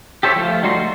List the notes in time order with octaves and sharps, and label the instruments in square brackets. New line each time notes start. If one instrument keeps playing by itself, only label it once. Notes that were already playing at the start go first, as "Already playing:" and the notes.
[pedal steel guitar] G4 A4 C5 C#5 E5
F3 A3 F4
F#3 G3 D#4 F#4 C6
A3